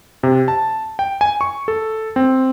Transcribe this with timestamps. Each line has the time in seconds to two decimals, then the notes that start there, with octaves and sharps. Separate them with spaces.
0.23 C3
0.48 A5
0.99 G5
1.21 G#5
1.41 C#6
1.68 A4
2.16 C4